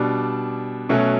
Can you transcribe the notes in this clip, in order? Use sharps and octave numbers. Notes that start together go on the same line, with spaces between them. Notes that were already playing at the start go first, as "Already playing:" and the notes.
Already playing: B2 G3 D4
B2 F#3 A3 C#4